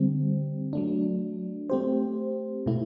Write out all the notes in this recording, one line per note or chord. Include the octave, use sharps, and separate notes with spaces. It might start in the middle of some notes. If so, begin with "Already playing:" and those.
Already playing: D3 G3 C4
F#3 A3 D4
A3 C4 G4 C5
B2 A3 E4